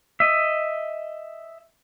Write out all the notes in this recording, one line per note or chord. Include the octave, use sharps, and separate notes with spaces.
D#5 E5